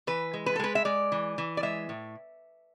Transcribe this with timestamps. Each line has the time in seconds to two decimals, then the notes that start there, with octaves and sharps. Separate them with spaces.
0.07 E3 B4
0.34 G#3
0.46 B4
0.56 A4
0.59 G#3 B4
0.75 E5
0.85 G#3 D5
1.12 E3
1.38 E3
1.57 D5
1.63 G#3 E5
1.89 A2